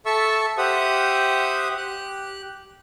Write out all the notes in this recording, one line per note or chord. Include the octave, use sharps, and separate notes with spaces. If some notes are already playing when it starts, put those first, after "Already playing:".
A4 E5 A5 C#6 E6
G4 C5 E5 F#5 D#6
G4 F#6